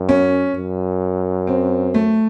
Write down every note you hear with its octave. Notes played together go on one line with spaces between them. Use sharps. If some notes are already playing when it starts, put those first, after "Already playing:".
Already playing: F#2
C#4
F#2
C4
A3